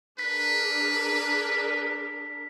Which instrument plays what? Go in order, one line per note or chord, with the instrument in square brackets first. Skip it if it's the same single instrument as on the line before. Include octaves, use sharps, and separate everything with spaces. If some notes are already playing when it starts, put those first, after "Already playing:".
[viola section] D4 G#4 A#4 [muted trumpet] B4 [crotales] B6